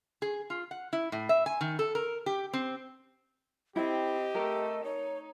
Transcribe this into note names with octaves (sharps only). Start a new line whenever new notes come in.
G#4
F4
F#5
E4
A2
E5
G#5
D#3
A4
A#4
G4
C4
C4 E4 G4 D#5
A3 A#4
D#4 C#5